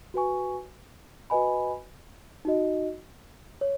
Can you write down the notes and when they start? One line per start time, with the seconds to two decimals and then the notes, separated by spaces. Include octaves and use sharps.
0.14 F#4 B4 G#5 C#6
1.30 F#4 B4 D#5 G#5 B5
2.45 D#4 F#4 D#5
3.61 C#5